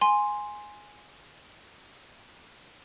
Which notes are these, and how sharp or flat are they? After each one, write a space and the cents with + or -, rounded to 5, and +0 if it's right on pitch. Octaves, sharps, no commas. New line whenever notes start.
G#5 +0 C6 +0